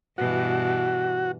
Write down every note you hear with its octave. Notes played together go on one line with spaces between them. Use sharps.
G2 B2 E3 F#4